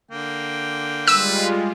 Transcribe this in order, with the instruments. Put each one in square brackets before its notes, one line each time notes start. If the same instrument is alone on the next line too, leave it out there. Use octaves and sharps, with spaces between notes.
[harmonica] D3 A#3 G5
[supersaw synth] G3 G#3 F4 [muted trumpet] B4 [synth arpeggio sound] E6